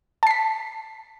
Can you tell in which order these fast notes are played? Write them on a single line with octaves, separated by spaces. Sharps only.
A5 C7 B6